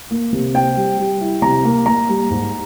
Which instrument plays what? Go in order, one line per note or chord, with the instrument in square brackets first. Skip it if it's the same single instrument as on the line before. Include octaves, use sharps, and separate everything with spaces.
[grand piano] A#3
C3
C4 G5
G3
G3
E4
C3 A#5
A#3
A#3 A#5
G3
G#2